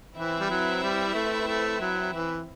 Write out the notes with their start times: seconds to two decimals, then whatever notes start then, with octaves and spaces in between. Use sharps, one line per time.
0.17 E3 C4 E4 B4 E5
0.41 G3
0.50 F#3
0.83 G3
1.15 A3
1.47 A3
1.81 F#3
2.12 E3